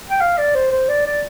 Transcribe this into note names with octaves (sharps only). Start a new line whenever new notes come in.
G5
F5
D5
C5
C5
D5
D5